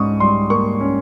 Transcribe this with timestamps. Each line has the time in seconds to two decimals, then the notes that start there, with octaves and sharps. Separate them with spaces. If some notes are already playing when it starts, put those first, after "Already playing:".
Already playing: G#2 C#4 C#6 D#6
0.20 G3 C6
0.50 A#3 C#6
0.81 C#4